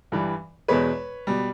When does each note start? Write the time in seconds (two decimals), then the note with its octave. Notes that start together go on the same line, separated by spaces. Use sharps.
0.12 G2 E3 G3
0.68 E2 B2 G#3 B4 C#5
1.27 B2 G3